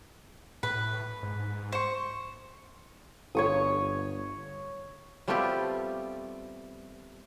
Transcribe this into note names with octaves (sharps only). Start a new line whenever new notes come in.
A2 B4
G#2
C5 C#6
G1 C#5 C#6 D#6
G3 A3 B3 C4 F4 G4